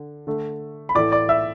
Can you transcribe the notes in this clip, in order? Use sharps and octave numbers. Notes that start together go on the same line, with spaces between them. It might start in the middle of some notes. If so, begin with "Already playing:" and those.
Already playing: D3
D3 A3
B5
A2 E3 A3 D5 D6
D5 D6
E5 E6